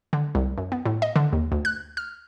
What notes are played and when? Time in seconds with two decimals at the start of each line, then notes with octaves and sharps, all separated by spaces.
0.13 D3
0.35 C2
0.58 F#2
0.72 B3
0.86 A2
1.02 D#5
1.16 D3
1.33 D#2
1.52 D2
1.65 F#6
1.97 F6